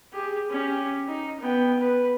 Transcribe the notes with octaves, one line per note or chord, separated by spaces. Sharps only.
G4 G#4
C#4 G4
D#4
B3 G5
B4